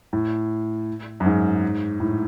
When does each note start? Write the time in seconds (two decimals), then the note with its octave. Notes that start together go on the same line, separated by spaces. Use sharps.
0.13 A2
1.20 F#2
1.26 G#2
2.00 A2